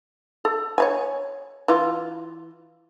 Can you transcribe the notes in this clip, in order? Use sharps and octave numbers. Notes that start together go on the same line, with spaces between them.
A4
C#5 F5 G#5
E3 F4